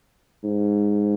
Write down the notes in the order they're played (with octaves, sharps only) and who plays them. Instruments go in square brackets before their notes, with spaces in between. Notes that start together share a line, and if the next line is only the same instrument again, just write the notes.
[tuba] G#2